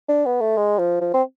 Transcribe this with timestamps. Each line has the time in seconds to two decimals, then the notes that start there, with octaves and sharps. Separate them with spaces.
0.09 D4
0.26 B3
0.41 A3
0.57 G#3
0.79 F3
1.01 F3
1.14 C4